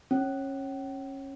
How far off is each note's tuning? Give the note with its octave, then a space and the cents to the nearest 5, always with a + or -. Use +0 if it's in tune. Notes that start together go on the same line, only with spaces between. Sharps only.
C#4 -25